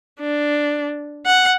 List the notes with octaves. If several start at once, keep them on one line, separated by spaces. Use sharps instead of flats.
D4
F#5